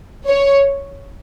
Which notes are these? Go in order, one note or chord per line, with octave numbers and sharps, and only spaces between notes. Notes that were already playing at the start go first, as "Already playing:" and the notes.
C#5